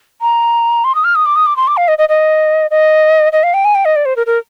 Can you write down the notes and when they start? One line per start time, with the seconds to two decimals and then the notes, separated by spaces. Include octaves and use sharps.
0.22 A#5
0.84 C6
0.95 D#6
1.04 F6
1.15 D#6
1.26 D6
1.36 D#6
1.46 D6
1.56 C6
1.67 D6
1.77 F5
1.88 D#5
1.98 D#5
2.09 D#5
2.71 D#5
3.33 D#5
3.43 F5
3.54 G5
3.65 G#5
3.75 G5
3.85 D#5
3.96 D5
4.05 C5
4.16 A#4
4.26 A#4